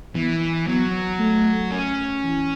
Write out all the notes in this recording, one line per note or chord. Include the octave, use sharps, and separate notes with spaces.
E3 B3
F#3 B3
A3
C#4
E3